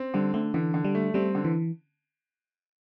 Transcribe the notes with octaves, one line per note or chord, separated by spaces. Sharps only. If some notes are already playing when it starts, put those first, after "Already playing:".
Already playing: C4
D3 G3
D3 A3
D3 E3
D3
G3
A3
G3 C4
D3
E3